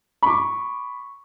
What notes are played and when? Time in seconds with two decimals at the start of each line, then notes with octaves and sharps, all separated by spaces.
0.23 B5 C#6 D6